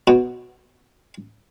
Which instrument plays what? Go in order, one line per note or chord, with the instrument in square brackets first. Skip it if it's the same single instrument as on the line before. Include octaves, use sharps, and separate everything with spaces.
[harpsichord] B2